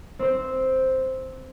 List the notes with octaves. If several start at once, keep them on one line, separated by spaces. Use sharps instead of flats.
C4 C5